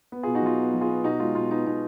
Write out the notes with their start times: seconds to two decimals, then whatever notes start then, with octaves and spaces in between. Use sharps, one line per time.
0.12 B3
0.23 B2 F4 G#4
0.35 D#4 F#4
0.42 F#3 F4
0.58 B3
0.74 F#3
0.81 F4 G#4
0.89 B3
1.04 B2 D#4 F#4
1.20 G#3 F4
1.35 B2 F4
1.50 B3 D#4
1.66 B2 D#4